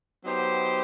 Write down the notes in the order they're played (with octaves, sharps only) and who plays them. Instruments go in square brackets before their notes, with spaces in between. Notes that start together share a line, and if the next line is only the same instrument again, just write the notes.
[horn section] F#3 B3 D#4 G4 C5